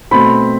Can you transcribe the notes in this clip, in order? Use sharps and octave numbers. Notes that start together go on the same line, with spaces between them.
B2 A3 C4 B5